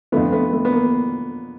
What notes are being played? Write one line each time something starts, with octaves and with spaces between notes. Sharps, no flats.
F2 D3 F3 A3 B3
A3 B3
A3
B3
A#3